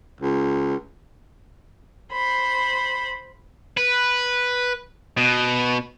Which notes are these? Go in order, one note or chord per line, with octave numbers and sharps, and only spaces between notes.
C#2
C5 B5
B4
B2